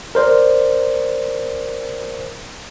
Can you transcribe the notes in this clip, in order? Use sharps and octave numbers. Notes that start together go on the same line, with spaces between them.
A#4 C5 D5